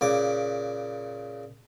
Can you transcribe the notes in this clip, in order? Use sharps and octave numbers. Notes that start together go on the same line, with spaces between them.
A#2 C#3 D6